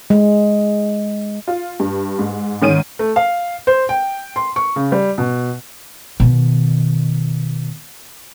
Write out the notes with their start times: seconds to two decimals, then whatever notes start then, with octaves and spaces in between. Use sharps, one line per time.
0.10 G#3
1.48 F4
1.80 G2
2.19 G#2
2.62 G#2 D#3 C#4 D7 D#7
2.99 A3
3.16 F5
3.67 C5
3.89 G5
4.36 C6
4.56 C#6
4.76 C#3
4.92 G3
5.18 B2
6.20 B2 D#3